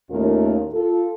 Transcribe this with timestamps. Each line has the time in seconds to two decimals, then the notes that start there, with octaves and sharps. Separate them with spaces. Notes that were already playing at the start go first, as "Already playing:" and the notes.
0.10 D#2 A2 A3 C#4 F4 A#4
0.73 F4 A4